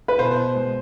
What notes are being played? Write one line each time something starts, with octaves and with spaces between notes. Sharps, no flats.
B4
B2 C5
G#3